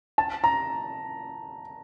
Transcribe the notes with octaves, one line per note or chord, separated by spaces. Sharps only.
A5
A#5